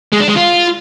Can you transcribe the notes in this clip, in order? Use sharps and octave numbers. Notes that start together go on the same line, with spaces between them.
G#3
D4
G#3
F4